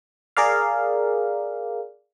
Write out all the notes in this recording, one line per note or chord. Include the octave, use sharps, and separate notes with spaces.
G#4 A#4 D5 F5